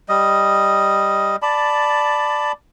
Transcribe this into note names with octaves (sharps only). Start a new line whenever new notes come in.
G3 D#5
D5 A5 B5